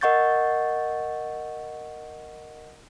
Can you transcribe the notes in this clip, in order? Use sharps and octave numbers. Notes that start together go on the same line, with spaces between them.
A#4 D#5 F#5 C#6 G6 A6